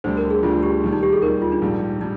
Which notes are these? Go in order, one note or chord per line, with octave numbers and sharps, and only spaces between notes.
D2 D3 G3 C5
A#4
G#4
D2 D3 G3 F4
G4
D#2 D#3 G3
D#4
G4
G#4
D#2 D#3 G3 A#4
F4
D4
A#1 G#2 G3
G3 D#4